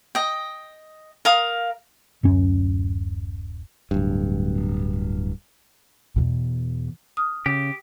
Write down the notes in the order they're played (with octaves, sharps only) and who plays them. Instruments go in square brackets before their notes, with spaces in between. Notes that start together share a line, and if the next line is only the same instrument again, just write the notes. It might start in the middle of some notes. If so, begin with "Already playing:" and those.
[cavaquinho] D#5 G5
A#4 F5 D#6
[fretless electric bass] D1 F#2 C#4
[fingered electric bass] D1 G2
[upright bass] E2 B2
[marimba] D#6 F6
[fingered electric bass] C#3 [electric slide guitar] G4